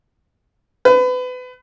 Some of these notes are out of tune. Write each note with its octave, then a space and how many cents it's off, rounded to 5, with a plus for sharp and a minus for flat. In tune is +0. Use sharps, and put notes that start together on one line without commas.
B4 +30